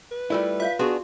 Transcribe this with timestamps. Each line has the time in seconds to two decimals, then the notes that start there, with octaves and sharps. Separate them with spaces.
0.12 B4
0.30 G3 A3 E4 F4 A#4 D5
0.60 F4 C#5 E5 F5
0.79 B3 D4 F#4 G#4 C6